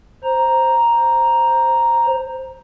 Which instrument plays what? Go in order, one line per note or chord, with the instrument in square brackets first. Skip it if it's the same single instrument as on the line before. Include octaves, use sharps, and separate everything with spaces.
[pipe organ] C5 A#5